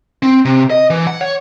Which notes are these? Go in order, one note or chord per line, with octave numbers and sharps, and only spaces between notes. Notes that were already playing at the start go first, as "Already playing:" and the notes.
C4
C3
D#5
E3
F#5
C#5